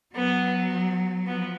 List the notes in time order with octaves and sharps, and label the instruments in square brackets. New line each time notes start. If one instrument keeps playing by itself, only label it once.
[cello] F#3 [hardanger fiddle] B3
[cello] F3 [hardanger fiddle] B3